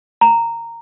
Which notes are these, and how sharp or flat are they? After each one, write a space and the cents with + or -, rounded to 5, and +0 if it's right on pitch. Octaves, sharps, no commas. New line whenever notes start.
A#5 -10